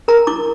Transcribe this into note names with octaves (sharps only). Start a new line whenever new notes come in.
A#4 A#5
E4 D6